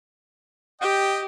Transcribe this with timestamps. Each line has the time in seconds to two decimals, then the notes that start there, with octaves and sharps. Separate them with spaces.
0.81 G4 D#5 G5